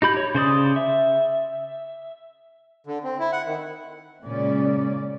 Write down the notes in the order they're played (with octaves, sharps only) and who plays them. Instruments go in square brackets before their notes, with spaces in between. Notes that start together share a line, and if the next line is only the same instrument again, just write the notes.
[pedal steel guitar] D#4 G4 B5 G6
C#5
C#3 C5 D5 D#6
E5
[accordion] D3
C4
E4
F#5
D#3
[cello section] A#2 C#3 G#3 C#4 D5